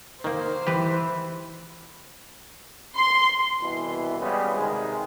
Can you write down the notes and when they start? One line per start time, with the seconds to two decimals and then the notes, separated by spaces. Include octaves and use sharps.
0.24 D#3 A#3 C5
0.67 E3 G4 B4
2.96 C6
3.60 C2 B2 E3
4.19 C#3 G3 G#3 B3
4.54 C3 D#3 G#3